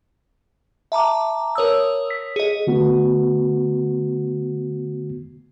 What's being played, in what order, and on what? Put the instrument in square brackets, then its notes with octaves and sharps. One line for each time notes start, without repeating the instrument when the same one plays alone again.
[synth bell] E5 A5 A#5 D6
A#4 C#5 D#6 E6
B6
G#4 D#5
[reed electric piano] D3 A3 B3 F#4